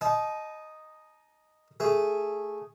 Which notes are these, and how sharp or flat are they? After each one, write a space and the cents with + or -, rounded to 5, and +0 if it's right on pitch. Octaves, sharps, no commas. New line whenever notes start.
D#4 +0 D#5 +0 A5 -35
A3 +0 G#4 +0